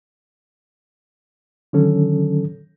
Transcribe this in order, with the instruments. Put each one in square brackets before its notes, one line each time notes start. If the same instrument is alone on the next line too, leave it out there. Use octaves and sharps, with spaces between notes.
[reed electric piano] D3 D#3 F#3 C#4 A4